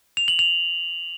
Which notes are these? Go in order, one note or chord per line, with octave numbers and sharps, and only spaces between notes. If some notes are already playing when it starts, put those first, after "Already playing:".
F7
F#7
F7